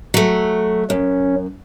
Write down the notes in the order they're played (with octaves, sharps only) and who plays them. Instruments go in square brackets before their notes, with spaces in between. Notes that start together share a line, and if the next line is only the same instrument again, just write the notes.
[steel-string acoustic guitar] F#3 A3
[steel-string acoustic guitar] F#2 [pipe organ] C#4